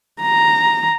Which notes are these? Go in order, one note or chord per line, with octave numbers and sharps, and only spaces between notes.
A#5